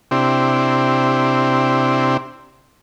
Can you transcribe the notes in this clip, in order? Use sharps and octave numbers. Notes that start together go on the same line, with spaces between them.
C3 C4 D4 E4 G4